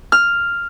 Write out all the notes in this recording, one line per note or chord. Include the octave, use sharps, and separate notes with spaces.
F6